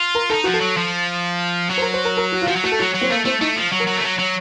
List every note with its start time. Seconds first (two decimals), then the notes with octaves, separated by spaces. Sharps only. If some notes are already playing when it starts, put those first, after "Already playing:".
Already playing: F4
0.15 A#4
0.30 D#4 A4
0.44 F3 F#4
0.53 A4
0.61 F#3
0.77 F3
1.70 F#3
1.77 C5
1.82 A#4
1.94 C5
2.05 A#4
2.17 A#4
2.32 F#4
2.42 F4
2.48 F3 F#4
2.56 F#3
2.64 A3 F#4
2.72 A4
2.79 F#3 F#4
2.94 F#3
3.01 C4
3.10 A3 A#3
3.25 A3 C4
3.41 A3 D#4
3.56 F3
3.72 F#3
3.80 A#4
3.87 F#3
3.97 A3
4.03 F#3
4.19 F#3